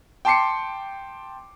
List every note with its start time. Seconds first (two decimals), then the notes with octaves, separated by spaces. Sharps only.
0.25 G5 A5 C6 D6 C7 C#7